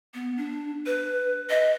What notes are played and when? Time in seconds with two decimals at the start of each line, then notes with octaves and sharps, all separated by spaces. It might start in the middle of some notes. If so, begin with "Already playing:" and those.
0.14 B3
0.37 D4
0.86 B4
1.50 D#5